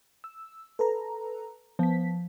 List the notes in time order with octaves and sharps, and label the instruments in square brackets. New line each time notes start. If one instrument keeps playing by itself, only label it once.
[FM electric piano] E6
A4 B4 A#5
[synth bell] F3 [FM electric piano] B3 B6